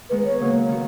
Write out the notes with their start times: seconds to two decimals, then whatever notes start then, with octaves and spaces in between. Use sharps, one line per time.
0.10 D#3 G#3 B3 B4
0.25 C#5
0.40 C#3 F#3 A#3
0.68 D#3 F#3 B3 F#4